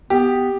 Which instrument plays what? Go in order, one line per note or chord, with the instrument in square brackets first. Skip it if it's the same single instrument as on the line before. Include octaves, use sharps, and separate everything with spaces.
[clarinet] B3 [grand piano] G4